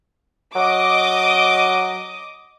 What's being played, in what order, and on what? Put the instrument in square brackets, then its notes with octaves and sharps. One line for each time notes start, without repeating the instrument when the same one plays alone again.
[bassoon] F#3 [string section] D#5 D6